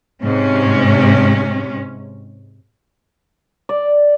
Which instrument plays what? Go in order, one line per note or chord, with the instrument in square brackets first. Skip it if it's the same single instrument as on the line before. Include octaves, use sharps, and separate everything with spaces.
[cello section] G#2 C3 C#4
[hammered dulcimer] D5